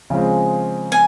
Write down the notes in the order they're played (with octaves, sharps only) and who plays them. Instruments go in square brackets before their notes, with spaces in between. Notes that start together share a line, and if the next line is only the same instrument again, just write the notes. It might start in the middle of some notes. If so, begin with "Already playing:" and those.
[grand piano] C#3 F3 G#3 C4
[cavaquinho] G#5